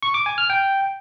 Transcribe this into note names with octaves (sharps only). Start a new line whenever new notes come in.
C#6
D6
G#5
F6
G5